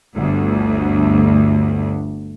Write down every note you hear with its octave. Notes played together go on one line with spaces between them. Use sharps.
G1 D2